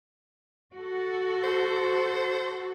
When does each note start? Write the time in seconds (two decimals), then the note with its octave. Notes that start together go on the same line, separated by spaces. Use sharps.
0.74 F#4 A4
1.44 C5